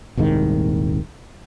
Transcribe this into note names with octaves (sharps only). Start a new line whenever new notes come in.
D#1 C2 G#2 D#3